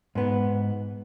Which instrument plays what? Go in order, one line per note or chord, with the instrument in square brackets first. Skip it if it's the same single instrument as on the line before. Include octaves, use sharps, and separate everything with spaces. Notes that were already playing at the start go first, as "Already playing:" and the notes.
[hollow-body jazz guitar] G#2 B3